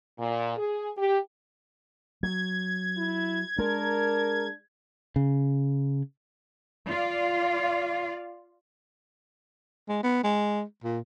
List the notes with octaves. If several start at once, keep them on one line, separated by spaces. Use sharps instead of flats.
A#2
G#4
G4
F#3 G#6
E4
G#3 D4 A#4
C#3
F4 D5 F5
G#3
B3
G#3
A#2